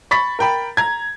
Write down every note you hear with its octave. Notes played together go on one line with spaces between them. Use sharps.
B5 C#6 A6 B6
A#4 G5 B5
A#5 G#6